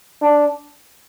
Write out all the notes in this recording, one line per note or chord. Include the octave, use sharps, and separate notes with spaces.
D4